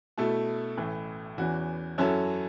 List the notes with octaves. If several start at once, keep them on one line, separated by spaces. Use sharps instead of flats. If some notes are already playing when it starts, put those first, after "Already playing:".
B2 A3 E4 A4
A1 A2 E3 A3
E2 E3 C#4 F#4
F#2 F#3 C#4 E4 A4